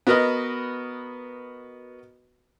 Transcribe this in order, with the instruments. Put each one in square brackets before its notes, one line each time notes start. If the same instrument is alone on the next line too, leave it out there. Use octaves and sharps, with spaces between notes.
[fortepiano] B3 F#4 A#4 B4 D#5